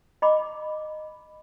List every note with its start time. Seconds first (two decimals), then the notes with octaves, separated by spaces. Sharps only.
0.22 D#5 A#5 B5 D6